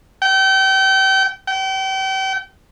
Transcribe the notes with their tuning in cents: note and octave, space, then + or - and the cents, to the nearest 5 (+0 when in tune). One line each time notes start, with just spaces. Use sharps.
G5 -30
G5 -35